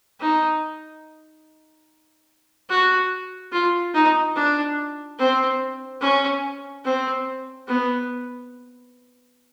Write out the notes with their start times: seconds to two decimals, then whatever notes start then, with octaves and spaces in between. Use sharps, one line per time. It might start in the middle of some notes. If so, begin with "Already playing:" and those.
0.20 D#4
2.70 F#4
3.52 F4
3.94 D#4
4.35 D4
5.19 C4
6.01 C#4
6.84 C4
7.68 B3